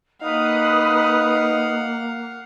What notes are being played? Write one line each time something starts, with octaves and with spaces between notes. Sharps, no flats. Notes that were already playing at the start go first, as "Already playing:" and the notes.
A#3 D#4 B4 F5 F#5 D#6